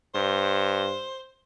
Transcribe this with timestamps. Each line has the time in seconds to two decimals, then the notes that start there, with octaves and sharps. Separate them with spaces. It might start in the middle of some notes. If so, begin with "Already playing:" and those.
0.15 G2 C5